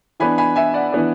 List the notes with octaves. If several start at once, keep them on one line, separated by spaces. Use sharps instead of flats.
E3 B3 D4 G#5 B5
G#5 B5
E5 G#5
D5 F#5
E3 B3 D4